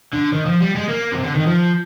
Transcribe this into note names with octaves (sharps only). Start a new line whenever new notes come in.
D3
D#3
F3
G3
G#3
A#3
C3
D3
D#3
F3